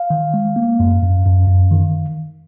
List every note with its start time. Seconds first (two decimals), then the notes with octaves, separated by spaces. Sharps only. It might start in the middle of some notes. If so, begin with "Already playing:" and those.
Already playing: F5
0.10 D#3
0.34 G#3
0.56 A#3
0.80 F#2
1.02 F#2
1.26 F#2
1.48 F#2
1.71 D#3